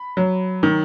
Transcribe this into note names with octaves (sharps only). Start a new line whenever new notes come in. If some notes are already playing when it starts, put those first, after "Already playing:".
Already playing: B5
F#3
D#3